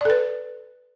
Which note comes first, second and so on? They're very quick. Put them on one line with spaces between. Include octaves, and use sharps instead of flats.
D5 A4 B4